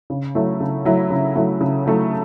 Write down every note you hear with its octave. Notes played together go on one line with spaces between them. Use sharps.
C#3
F#3 A3 E4
C#3
F#3 A3 E4
C#3
F#3 A3 E4
C#3
F#3 A3 E4